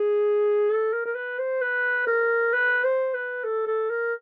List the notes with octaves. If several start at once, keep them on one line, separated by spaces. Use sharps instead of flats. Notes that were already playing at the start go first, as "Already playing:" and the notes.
Already playing: G#4
A4
A#4
A#4
B4
C5
B4
A#4
B4
C5
B4
A4
A4
A#4